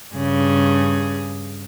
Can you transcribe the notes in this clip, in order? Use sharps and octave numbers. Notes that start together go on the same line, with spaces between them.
G2 C#3 G#4